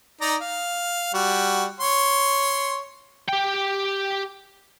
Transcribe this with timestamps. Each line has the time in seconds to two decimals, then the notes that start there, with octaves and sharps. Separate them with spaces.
0.21 D#4 D5 A#5
0.41 F5
1.14 G3 F#4
1.81 C#5 C6
3.29 G4 G5